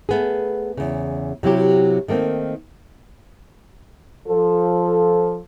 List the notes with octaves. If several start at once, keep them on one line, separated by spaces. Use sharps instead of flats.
A3 B3 G#4
E2 C#3
C3 F#3 E4 G4
D#3 A3 A#3 C4
F3 A4